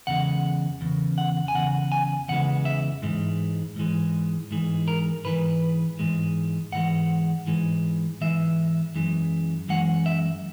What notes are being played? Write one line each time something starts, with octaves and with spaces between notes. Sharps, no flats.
E2 C#3 G#3 F#5
E2 C#3
F#5
G#5
E2 C#3 F#5
G#5
E2 C#3 E3 G#3 F#5
E5
G#2 E3 G#3
G#2 E3 G#3
G#2 E3 G#3
A#4
G#2 E3 G#3 B4
G#2 E3 G#3
G#2 E3 G#3 F#5
G#2 E3 G#3
G#2 E3 G#3 E5
F#2 E3 G#3
F#2 E3 G#3 F#5
E5